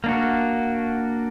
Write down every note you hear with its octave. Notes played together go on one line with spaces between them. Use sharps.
A#3 D4 F#4